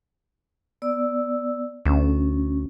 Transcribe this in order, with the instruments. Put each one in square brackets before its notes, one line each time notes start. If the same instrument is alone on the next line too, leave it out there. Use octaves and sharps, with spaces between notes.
[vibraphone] B3 D5 E6
[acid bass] D2 [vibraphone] C#4